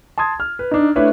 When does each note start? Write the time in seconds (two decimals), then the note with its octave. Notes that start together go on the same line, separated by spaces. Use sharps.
0.18 A5 C6 D#6 G#6
0.40 F6
0.59 B4
0.71 D4 D#4
0.96 A3 D4 E4 B4 C#5 E5